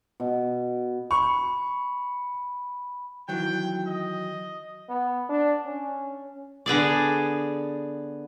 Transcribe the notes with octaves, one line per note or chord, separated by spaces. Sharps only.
B2
B5 C#6
D#3 E3 F#3 G5
D#5
B3
D4
C#4
D3 B3 G#4 D5